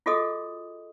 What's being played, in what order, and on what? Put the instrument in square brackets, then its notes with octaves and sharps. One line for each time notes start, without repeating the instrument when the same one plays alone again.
[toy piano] F4 F#4 G#4 A4 D#5 D#6